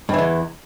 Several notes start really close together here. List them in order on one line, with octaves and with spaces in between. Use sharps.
G2 E3 E2